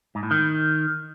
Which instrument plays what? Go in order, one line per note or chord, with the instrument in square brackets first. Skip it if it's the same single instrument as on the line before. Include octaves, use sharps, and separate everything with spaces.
[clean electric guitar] G#2
A2
D#3